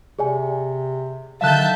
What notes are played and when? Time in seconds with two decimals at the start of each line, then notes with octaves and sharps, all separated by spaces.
0.19 C3 G#4 D5 G#5
1.41 D3 D#3 F#3 E5 F5 A5 F#6 G6